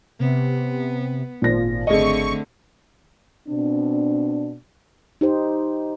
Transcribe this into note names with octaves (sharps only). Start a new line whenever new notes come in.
C3 B3
G#1 A#2 F3 A#6
G#1 D3 A3 C4 G#4 D#5 C#6
B2 C4 D4
D#4 G4 C5